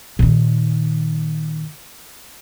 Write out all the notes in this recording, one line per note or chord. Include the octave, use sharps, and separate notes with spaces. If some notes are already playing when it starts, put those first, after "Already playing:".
A#2 D#3